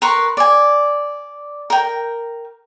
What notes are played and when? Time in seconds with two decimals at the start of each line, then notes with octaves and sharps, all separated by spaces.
0.02 A#4 B4 C6 C#6
0.37 D5 G#5
1.70 A#4 G5